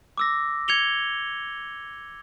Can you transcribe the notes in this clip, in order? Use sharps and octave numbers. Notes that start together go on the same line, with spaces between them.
D6 E6 A#6
G#6 C#7 F7 G7